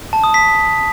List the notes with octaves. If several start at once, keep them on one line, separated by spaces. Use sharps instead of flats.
A5
D#6
B6